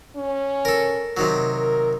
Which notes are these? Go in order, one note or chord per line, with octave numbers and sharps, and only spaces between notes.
C#4
A4 A#4
C3 D#3 F#3
A#4